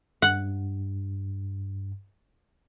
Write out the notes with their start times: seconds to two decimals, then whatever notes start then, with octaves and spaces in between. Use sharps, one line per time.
0.22 G2 F#5